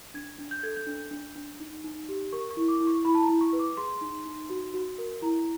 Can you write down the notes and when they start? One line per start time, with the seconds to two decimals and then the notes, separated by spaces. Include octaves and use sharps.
0.14 D4 G#6
0.38 D4
0.51 G6
0.63 A4 G#6
0.76 G6
0.87 D4
1.11 D4
1.35 D4
1.60 D#4
1.84 D#4
2.08 G4
2.32 A#4 C#6
2.51 C#6
2.57 E4
2.68 D6
2.80 E4
2.87 C#6
3.05 E4 B5
3.15 A5
3.23 A#5
3.29 E4
3.41 C#6
3.53 B4
3.59 D6
3.77 G#4 C6
4.01 D#4
4.25 D#4
4.50 F#4
4.74 F#4
4.98 A#4
5.22 E4 A#5